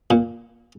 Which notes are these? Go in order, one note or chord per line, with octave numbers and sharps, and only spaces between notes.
A#2